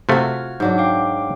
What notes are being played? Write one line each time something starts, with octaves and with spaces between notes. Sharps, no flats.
C3 A3 F4 F#4 F6 G#6
G#2 F#3 D4 G6
F5 G5 D6